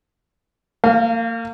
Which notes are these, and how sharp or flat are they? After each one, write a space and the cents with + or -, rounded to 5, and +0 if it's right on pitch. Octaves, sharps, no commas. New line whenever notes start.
A#3 -35 F5 +0